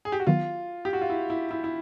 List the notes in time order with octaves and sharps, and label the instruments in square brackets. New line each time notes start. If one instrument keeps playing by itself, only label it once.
[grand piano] G#4
G4
F#4
[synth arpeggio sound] D#3 F#3 B3 [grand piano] F4
[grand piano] G4
F#4
F4
E4
E4
E4
E4